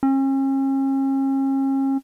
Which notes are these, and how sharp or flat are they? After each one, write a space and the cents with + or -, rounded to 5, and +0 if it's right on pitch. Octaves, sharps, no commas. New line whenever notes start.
C#4 -40